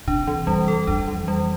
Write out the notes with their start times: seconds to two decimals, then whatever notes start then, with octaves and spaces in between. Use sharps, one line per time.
0.07 C3 D4
0.27 E3
0.47 F2 G3
0.68 A4
0.87 F2 D4
1.08 E3
1.28 G3